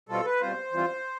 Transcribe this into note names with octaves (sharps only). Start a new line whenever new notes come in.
B2 G3 C4 F4 A4
B4
B2 G3 C4 F4 C5
E3 G3 C4 F4